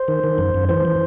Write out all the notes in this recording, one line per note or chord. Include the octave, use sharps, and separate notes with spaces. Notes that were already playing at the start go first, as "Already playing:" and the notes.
Already playing: C5
D#3
D#3
F#2
F#2
E3 C5
E3